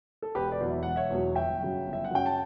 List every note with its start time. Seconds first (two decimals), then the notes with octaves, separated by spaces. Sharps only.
0.22 A4
0.35 E1 G4 B4
0.52 B4 D5
0.61 E2 B2 F#3
0.69 E5
0.83 E1 F#5
0.96 C#5 E5
1.10 E2 B2 F#3
1.35 G1 E5 G5
1.61 F#2 C#3 F#3
1.87 G1
1.93 E5
2.05 F#5
2.11 F#2 C#3 F#3 G5
2.26 A5